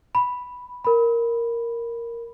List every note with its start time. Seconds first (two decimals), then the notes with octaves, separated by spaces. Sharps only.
0.15 B5
0.84 A#4 B5